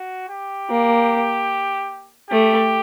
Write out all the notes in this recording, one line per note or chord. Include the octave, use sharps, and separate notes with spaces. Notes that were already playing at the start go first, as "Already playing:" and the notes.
Already playing: F#4
G4
A#3
A3 G4